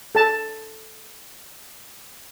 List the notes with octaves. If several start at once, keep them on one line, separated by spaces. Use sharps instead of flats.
A4 A5